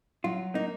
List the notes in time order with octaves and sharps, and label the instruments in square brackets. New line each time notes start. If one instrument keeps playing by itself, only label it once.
[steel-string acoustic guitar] F#3 [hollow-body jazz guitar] F4
[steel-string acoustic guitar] A#3 [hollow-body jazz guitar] D#4